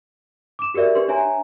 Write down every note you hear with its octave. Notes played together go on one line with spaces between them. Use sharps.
D6 E7
F#4 G4 A#4 D5 E5
D4 G4 B4 C6
D4 C#5 E5 G#5 A#5